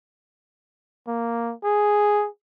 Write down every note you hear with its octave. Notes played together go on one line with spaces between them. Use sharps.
A#3
G#4